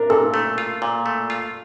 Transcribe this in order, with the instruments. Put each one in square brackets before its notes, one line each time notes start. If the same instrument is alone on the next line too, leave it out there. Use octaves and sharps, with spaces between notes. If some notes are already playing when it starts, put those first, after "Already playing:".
Already playing: [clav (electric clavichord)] D4 [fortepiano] A#4
[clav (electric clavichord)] A#2 [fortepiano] A4
[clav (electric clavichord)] A3
F4
A#2
A3
F4